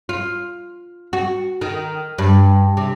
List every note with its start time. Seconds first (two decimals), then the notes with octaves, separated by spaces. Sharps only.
0.09 F4
1.13 F#4
1.61 D#3
2.18 G2
2.77 C3